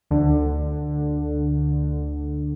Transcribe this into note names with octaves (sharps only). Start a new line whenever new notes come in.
D2 D3